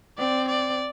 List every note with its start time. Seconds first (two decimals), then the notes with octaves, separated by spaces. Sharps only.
0.18 C4 D5
0.49 D5